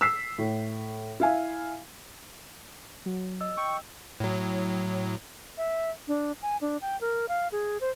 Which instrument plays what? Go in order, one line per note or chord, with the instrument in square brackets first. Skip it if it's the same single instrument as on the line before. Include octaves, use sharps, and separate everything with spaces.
[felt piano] E6 B6 C7
A2
E4 F5 G#5
[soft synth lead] F#3
[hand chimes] D#5 E6
[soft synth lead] G5 [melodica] C#6
[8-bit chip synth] A2 F#3
[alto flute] E5
D4
G#5
D4
G5
A#4
F5
G#4
C5